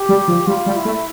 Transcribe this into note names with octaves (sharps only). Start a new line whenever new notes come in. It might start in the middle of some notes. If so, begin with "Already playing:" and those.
Already playing: G4
G3
F3
G3 F4
G3
E4
A3